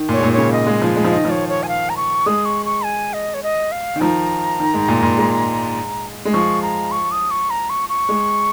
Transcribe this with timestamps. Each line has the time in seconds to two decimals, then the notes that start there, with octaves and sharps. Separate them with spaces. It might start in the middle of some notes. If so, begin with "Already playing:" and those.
Already playing: D#3
0.09 A#2 C#5
0.18 G#2
0.23 A#2
0.33 C#3 C#5
0.52 D#5
0.67 G#3
0.82 F3
0.96 G#3
1.05 F3
1.10 D#3 D#5
1.25 F3
1.30 C#5
1.49 C#5
1.63 G#5
1.68 F5
1.90 A#5
1.97 C#6
2.26 G#3 D#6
2.45 C#6
2.66 C#6
2.84 G#5
3.13 D#5
3.34 C#5
3.43 D#5
3.72 F5
3.96 D#3
4.00 F3 A#5
4.60 D#3
4.74 G#2
4.88 A#2
5.02 A#2
5.18 G#3
6.25 G#3
6.33 F3 C#6
6.62 A#5
6.91 C#6
7.12 D#6
7.31 C#6
7.50 A#5
7.70 C#6
7.89 C#6
8.09 G#3